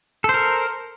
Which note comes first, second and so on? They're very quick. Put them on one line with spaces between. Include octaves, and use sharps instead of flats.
A4 C5 A#4